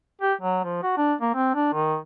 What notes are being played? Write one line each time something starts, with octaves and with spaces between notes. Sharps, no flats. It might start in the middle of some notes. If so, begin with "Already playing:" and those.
G4
F#3
F3
F#4
D4
A#3
C4
D4
D#3